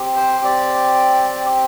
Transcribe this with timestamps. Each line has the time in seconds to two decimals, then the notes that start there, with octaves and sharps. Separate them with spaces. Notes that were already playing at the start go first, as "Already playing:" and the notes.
Already playing: C4 G4
0.16 C5
0.45 D5